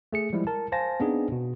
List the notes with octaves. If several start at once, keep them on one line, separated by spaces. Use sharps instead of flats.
A3 G#4 C#7
F3 G3 G#3 E4
A#4 A5
C5 F5 G#5 A5 A#6
B3 C4 D4 D#4 G#4
B2